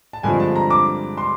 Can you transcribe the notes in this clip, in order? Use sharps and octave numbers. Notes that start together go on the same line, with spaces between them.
A5
G2 D3 F3 G#3 C4 G#5
A5
A#5
D6
C6